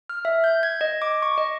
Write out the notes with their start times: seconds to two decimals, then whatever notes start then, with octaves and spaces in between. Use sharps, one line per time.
0.10 F6
0.25 E5
0.44 G6
0.63 G#6
0.81 D#5
1.02 D6
1.22 C#6
1.38 D#5